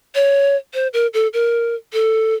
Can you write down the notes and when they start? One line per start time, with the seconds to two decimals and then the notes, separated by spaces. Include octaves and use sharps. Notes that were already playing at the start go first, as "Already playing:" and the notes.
0.15 C#5
0.74 C5
0.93 A#4
1.14 A4
1.33 A#4
1.93 A4